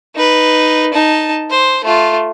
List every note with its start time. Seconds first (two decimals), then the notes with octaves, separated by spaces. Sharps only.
0.15 D#4 B4
0.93 D#4 A5
1.50 C5
1.84 A3 F4